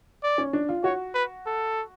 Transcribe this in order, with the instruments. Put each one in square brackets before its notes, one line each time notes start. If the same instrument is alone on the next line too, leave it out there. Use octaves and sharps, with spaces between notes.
[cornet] D5
[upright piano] C#4
D4
F4
[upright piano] F#4 [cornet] C#5
[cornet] B4
A4